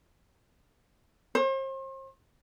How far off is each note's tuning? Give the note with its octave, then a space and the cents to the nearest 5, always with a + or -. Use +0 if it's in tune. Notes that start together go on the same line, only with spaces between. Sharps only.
C5 +40